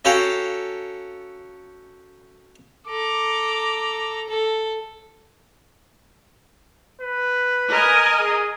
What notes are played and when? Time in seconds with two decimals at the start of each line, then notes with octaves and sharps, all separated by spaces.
0.05 C#4 F#4 A4 F5 G5 A#5
2.87 A4 A#5 D6
4.28 A4
7.02 B4
7.70 A#4 D#5 G#5
8.19 G#4